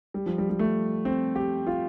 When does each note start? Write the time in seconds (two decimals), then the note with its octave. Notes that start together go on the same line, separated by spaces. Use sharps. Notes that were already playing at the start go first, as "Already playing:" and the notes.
0.14 G3
0.26 F3
0.38 G3
0.50 G3
0.59 A3
1.05 C4
1.36 G4
1.67 F4